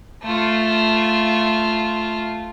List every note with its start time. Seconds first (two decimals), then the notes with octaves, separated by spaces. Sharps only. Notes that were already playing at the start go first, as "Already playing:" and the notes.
0.23 A3 F4